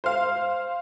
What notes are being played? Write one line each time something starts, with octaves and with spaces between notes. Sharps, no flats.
C5 F5